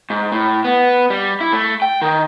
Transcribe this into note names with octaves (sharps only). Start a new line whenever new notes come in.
G#2
A2
B3
G3
E4
A3
G5
D#3